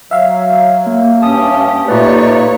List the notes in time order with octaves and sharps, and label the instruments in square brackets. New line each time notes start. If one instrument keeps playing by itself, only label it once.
[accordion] F#3 [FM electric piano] E5 F5
[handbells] A#3
[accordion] G2 C#4 [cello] G4 [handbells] A5 D#6
[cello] A#2 C#5 [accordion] A3 D#4 D5 [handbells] F4 G4 B4